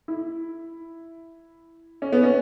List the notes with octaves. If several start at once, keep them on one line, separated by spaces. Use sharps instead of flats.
E4
C#4
B3
C#4